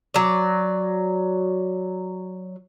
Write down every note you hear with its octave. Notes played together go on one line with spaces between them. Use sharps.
F#3 D5